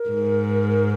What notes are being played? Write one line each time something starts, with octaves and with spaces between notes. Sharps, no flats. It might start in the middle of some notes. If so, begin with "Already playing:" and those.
Already playing: A#4
G#2